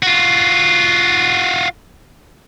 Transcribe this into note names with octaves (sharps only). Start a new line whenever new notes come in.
F4 F#4